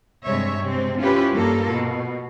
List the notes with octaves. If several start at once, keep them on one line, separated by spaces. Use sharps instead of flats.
G2 C3 G3 G#3 C#5 E5
C3 G#3 C4
C#4 E4 F4 G4 B4
G2 A#3 F4 A4 A#4
B2